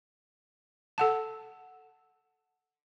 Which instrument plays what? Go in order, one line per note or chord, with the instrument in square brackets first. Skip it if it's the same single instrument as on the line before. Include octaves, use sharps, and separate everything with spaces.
[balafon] A4 F#5 A5